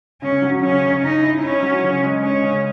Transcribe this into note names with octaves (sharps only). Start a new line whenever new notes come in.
C#3 C#4
F#3
C#3 C#4
C#3
C#3 D#4
E4
C#4 E4
F#3
C#3
G#3
G#3 C#4
C#3